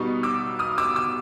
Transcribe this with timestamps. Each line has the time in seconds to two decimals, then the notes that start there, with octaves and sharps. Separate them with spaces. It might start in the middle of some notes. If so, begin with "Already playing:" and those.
Already playing: B2 G3 B3 D#4 C#6 D#6
0.23 D6 E6
0.59 D#6 F6
0.78 D6 E6
0.96 D6 E6